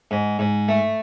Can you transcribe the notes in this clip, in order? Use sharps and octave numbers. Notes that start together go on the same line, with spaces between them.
G#2
G#2
A3